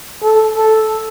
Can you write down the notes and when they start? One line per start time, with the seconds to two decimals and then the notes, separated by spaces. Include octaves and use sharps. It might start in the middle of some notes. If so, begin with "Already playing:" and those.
0.22 A4
0.57 A4